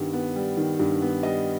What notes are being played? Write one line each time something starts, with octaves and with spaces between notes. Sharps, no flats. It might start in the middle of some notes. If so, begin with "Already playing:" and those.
Already playing: G2 D#3 G3 B3
B3
G3
D#3
G2
B3
G3 D#5